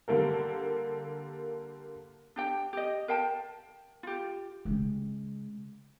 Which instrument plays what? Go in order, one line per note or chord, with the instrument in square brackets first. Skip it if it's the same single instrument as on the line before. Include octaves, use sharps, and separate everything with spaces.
[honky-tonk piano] D3 G3 A#3 A4 A#4
[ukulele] D4 G4 G5
G4 D#5
A#4 F5 G5 A5
F4 G4
[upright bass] C#3 G#3